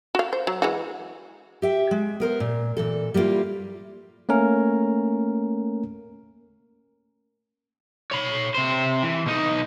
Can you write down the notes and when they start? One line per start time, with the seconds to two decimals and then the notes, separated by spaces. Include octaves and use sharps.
0.15 F#4 F5
0.33 C5
0.47 F#3
0.62 E3 G#3 F#4
1.62 G4 E5 G5
1.91 G#3
2.20 B3 A#4 C5
2.40 A#2
2.77 A#2 E3 A4
3.14 G3 A#3 B3 E4 F4
4.29 A3 A#3 C#4 A#4
8.11 C#5 B5
8.55 C3 C5
9.03 E3
9.26 B2 D#4